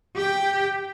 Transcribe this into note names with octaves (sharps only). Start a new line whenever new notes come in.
G4 G5